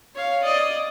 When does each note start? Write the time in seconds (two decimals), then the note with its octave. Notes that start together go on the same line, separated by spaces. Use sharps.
0.15 C#5 F5
0.43 D5 D#5